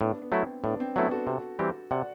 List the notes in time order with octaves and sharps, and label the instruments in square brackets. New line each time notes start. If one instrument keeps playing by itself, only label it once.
[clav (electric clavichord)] A2 [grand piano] B3 D4
[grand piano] B3
[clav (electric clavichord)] F#3 A3 E4
[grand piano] C4
[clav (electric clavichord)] A2 [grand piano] B3 D4
[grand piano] C4
[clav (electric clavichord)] F#3 A3 E4 [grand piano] B3 D4
[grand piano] F#4 A4
[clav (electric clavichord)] C3
E3 G3 C4 G4
[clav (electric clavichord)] C3 [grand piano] D5 F#5